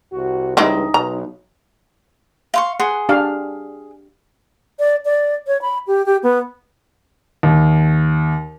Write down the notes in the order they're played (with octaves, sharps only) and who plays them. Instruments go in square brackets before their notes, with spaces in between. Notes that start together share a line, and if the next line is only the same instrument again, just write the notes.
[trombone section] C2 F#4
[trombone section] C#2 G2 [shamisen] E3 G#3 C4 [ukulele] C#4 D#4
[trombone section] B1 [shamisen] A#5
[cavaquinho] F5 C6 C#6
[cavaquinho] G#4 [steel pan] F#5 C6
[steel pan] D4 G4 F5
[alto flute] D5
D5
C#5
B5
G4
G4
B3
[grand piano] D#2